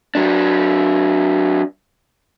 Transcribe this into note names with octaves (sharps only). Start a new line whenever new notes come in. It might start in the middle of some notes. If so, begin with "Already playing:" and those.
F#3 D4